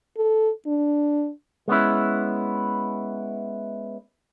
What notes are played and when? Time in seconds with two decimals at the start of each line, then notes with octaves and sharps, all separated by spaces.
0.17 A4
0.67 D4
1.68 G#3 B3 C#4 E4